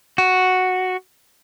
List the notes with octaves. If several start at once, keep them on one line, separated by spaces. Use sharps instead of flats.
F#4